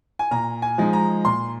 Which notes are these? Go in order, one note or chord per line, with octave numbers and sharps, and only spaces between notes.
G#5
A#2 A#5
G#5
F3 G#3 D#4
A#5
A#2 C6